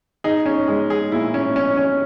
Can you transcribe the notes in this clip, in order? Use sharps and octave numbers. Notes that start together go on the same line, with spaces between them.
D#4 G#4
C#4
G#3
G#4
A#2 E4
C#4
C#4
C#4